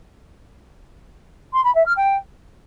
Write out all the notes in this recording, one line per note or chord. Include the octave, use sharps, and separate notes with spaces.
C6
B5
E5
F6
G5